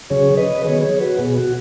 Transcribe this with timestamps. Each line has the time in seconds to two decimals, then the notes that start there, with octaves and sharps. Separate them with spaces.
0.10 C#3 F#3 C#4 G#4 C#5
0.37 B4 D#5
0.64 D#3 F#3 B3 G#4 C#5
0.82 G#4 C#5
1.00 F#4 B4
1.18 B2 B3 G#4
1.36 F#4